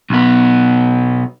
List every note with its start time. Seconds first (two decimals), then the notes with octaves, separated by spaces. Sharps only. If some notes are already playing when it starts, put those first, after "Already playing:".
0.10 B1 B3